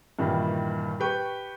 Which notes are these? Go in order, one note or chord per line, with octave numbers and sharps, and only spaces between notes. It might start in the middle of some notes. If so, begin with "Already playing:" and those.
G2 A#2 D#3 E3 G3
G4 B4 G5 C#6